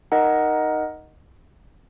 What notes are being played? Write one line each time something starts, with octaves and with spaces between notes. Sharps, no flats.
D#4 A#4 D#5 F#5